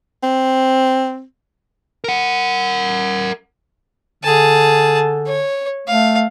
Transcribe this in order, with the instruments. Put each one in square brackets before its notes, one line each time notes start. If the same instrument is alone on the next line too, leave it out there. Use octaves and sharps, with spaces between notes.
[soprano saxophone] C4
[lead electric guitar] A#4 F#5
[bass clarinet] D3 [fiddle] G#4 A5
[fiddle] C#5
[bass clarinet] A3 [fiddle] F5